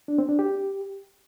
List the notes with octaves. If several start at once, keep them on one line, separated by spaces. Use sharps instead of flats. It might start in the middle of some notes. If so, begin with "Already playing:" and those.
D4
C4
D4
G4